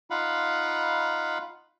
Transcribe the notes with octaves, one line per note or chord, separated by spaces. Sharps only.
D#4 F4 F5 F#5 B5